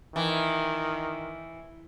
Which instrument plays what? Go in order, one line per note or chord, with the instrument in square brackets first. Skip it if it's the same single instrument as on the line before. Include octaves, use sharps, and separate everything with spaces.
[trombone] D#3 [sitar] E3